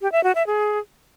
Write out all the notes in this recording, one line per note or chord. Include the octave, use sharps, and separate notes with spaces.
G4
E5
F#4
E5
G#4